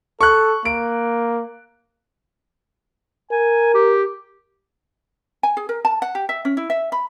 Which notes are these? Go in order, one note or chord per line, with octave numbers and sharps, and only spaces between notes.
A4 C#6 F#6
A#3 D7
A#4 G#5
G4
G#5
G#4
A#4
A5
F#5
G4
E5
C#4
E4
E5
B5